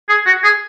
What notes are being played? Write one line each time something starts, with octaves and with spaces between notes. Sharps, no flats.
G#4
F#4
G#4